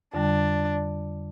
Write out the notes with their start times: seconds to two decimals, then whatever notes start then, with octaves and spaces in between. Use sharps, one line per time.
0.14 F2 D3 G3 D4